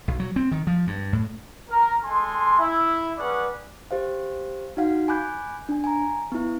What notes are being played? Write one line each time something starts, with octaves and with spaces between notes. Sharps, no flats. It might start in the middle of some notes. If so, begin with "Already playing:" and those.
B1
F#3
C4
D#3
F3
G2
A2
A#4
G#3 A4 G#5 C6
E4
G3 C#4 G#4 B4 D5 F#5
G4 C5 F5
D#4 F#4 F5 F#5
G#5 B5 D6 F#6 G6
D4 G#5
G#5 A#5
B3 E4